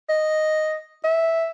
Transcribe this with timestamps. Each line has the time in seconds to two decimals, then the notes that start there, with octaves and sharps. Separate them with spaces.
0.09 D#5
1.04 E5